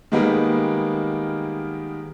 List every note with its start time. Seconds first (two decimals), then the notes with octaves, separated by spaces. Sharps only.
0.12 D#3 G3 G#3 A#3 B3